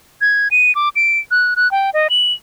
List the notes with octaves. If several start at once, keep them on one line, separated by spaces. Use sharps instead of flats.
G#6
D#7
D6
D7
F#6
F#6
G5
D#5
F#7